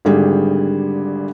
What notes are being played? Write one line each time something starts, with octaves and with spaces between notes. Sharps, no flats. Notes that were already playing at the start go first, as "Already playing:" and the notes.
G#1 D3 G3 G#4